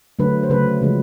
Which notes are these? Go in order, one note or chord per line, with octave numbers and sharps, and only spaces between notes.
D3 F#3 A3 B4
C5
C#3 F#3 A3 B4
C#3 F3 G#3